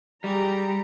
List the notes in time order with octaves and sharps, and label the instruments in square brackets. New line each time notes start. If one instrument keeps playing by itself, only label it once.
[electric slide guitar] G3 [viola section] G4 G#4 A#5